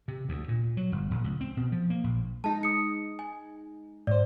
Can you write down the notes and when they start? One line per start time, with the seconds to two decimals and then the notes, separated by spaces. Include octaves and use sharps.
0.08 C3
0.29 D2
0.48 A#2
0.77 F#3
0.92 G1
1.11 A#1
1.24 C#2
1.41 C4
1.57 B2
1.72 F3
1.90 A#3
2.04 A#1
2.44 G#3 D#4 A5
2.63 D#6 C#7
3.19 G#5
4.07 G#2 C5 D5